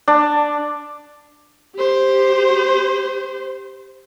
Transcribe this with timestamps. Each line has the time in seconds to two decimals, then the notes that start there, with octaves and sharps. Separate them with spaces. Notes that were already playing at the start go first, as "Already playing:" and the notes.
0.08 D4
1.75 G4 C5